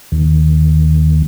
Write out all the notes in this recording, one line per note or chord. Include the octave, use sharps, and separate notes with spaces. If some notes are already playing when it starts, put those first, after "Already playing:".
D#2